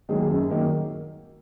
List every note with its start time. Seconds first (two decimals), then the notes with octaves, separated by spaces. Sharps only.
0.09 D#3 F#3 A#3 G#4
0.30 F#2
0.50 D#3 F#3 A#3